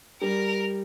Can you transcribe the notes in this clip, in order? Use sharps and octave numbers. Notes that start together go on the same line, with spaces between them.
G3 A#4